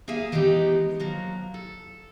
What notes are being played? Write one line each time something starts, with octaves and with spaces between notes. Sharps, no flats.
A#3 G#4 E5 F5 G#5
E3 G#3 B3 D#4 G4 D#5
F3 F#3 A#3
A4